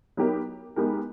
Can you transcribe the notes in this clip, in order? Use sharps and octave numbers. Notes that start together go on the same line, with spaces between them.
F#3 B3 D#4 G4 A#4
G#3 B3 D#4 G4 A#4